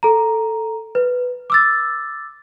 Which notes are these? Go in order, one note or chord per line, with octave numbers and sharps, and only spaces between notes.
A4 A#5
B4
D6 E6 A6